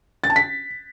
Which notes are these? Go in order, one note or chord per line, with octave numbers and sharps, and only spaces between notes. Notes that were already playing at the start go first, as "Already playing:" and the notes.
A6
A5
B6